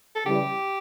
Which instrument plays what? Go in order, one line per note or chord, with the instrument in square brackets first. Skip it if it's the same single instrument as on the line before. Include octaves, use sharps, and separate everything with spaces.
[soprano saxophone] A4
[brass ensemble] C#3 E3 G3 [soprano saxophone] G4